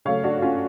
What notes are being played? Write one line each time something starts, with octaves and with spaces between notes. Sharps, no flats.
C#3 F#3 A3 C#5 F5
D4 F#4
C#4 F4